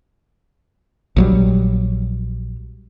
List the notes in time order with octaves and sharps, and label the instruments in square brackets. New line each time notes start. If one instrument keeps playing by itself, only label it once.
[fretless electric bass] A#1 F#3 G3